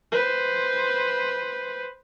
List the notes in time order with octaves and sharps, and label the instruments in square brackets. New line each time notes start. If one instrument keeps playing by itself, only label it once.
[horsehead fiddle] B4 C5